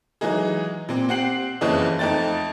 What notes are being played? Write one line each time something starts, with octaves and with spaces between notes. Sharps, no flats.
E3 F#3 G#3 D#4 G#4
A#2 C4
C4 G4 F#5 G5 C7 F#7
F#1 F2 C#3 E3 C#5 D#5
F2 A3 D#4 G5 A6